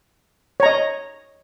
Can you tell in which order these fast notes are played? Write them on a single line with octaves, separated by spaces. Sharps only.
C#5 A#5 D#5